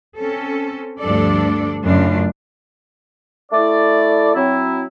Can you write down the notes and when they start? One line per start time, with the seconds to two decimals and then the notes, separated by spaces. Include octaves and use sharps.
0.18 C4 C#4 A4
1.00 D2 G2 F3 D4 A4 D5
1.83 F#2 A2 C#3 F#3 D4 F4
3.52 A3 E4 D5
4.35 F#3 C4 E4